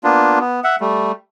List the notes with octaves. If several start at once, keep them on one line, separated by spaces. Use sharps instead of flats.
A#3 B3 D4 F4
B3
E5 F#5
G3 A3